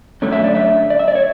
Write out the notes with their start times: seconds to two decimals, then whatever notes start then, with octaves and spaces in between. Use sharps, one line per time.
0.22 F#2 D3 A3 C#4
0.32 E5
0.44 D5
0.55 E5
0.90 D5
0.99 E5
1.08 D5
1.15 C#5